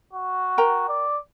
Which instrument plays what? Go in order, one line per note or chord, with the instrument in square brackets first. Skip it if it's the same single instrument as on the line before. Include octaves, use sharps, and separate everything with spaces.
[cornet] F#4
[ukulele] A#4 G5 A#5
[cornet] D5